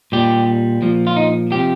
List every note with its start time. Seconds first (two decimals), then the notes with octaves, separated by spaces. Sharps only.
0.12 A#2 G3 G4
0.82 A#2 F3
1.07 F4
1.16 D#4
1.51 C3 F3 G4